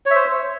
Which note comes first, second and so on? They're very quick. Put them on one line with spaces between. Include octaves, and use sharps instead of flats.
C#5 E5 C5